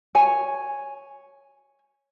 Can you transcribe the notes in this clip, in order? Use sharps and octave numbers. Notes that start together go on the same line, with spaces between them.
C#5 G#5